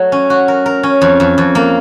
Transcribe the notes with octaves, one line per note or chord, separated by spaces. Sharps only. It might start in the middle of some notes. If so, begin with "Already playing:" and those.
Already playing: F#3 A3
C#4
F#4
A#4
A#4
C#4
F2
F2
F2
A#3